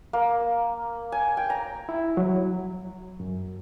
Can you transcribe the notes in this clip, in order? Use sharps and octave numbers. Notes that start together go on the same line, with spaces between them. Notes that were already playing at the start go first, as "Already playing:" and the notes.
A#3
G#5
G5
A#5
E4
F#3
F#2